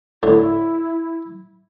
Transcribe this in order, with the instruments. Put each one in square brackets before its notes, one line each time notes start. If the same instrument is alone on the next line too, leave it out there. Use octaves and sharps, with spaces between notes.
[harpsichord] A2 D3 C#4 [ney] E4